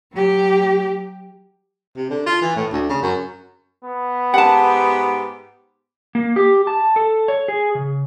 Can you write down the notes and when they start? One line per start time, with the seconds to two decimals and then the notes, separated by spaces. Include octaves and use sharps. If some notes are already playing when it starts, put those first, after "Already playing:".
0.13 F#3 G4
1.96 C3
2.10 D3
2.26 F4
2.42 E3
2.56 A2
2.72 D2
2.89 C#3
3.03 F#2
3.85 B3
4.34 G#2 G4 F#5 A5
6.15 A#3
6.36 G4
6.67 A5
6.96 A4
7.28 C#5
7.48 G#4
7.75 C#3